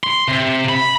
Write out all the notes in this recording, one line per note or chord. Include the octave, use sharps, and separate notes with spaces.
C6
C3
B5